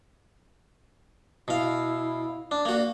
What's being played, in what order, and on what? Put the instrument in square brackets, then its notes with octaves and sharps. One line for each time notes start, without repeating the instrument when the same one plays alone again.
[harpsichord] B2 F5 [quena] E4
[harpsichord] D4 [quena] D6
[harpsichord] A#3 F#4 [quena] D5